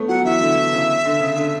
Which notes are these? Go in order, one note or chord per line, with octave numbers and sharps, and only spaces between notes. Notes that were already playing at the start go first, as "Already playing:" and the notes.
Already playing: A3 B3 C#4
F#3 F#5
E3 E5
D3
E3
C#3
D3
C#3
D3